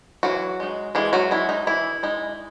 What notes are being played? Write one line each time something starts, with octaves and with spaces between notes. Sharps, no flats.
E3 F#3 F#4
G#3 D#4
E3 G#3 G#4
F#3 F#4
G#3 D#4 E4
D#4
E3 E4
G#3 D#4